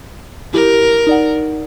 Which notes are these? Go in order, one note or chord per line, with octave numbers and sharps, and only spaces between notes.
E4 G4 A#4
D#4 D5 F#5